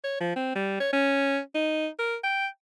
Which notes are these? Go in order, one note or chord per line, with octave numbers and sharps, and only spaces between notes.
C#5
F3
C4
G3
C#5
C#4
D#4
A#4
G5